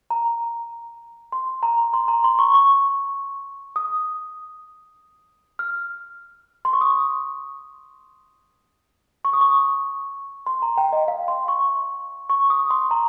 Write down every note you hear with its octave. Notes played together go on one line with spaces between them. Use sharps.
A#5
C6
A#5
C6
A#5
C6
C#6
C#6
D#6
F6
C6
C#6
D#6
C#6
D#6
C#6
C6
A#5
G5
D#5
F5
C6
C#6
C#6
D#6
C6
A#5